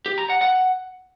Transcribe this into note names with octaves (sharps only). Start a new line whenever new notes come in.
G4
A#5
F#5
F#5